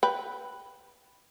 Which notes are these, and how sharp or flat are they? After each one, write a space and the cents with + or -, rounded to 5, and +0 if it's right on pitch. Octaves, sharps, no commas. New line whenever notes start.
B4 +0 G5 +0